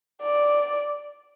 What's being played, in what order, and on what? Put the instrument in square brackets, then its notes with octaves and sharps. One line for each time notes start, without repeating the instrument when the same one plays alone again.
[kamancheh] D5